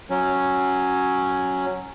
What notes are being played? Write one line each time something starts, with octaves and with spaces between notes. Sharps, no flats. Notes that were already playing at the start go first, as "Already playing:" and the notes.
F#3 C#4